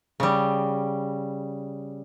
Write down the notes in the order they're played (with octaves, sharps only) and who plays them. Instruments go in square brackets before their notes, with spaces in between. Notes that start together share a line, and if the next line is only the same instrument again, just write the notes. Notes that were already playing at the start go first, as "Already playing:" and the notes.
[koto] C#3 G3